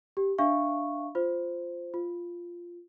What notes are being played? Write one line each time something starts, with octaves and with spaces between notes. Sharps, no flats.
G4
D4 E5 F5 C#6
F4 C5
F4